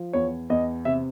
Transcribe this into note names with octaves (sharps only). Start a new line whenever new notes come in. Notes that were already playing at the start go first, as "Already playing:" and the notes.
Already playing: F3
E2 C#5
E2 D#5
C3 E5